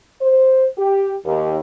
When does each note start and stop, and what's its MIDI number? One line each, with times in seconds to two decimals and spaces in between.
0.21 0.66 72
0.78 1.15 67
1.25 1.58 39